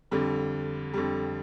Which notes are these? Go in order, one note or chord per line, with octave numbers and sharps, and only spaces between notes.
F2 D3 G3
F2 D3 G3